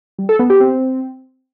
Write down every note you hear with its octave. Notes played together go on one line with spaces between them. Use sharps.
G3
A4
B3
G4
C4